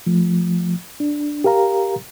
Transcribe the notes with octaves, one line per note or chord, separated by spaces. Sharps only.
F3 A3
D4
G4 A#4 F5 A#5